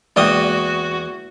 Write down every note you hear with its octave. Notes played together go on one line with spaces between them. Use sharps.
E2 G#3 A#3 F#4 G#4 D5 G5 D#6